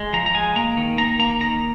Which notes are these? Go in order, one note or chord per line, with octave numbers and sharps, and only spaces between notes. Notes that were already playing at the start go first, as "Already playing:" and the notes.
Already playing: G#3
F3 A#5
A#5
G#3 G#5
A#3 A#5
D#3
A#3 A#5
A#3 A#5
D#3 A#5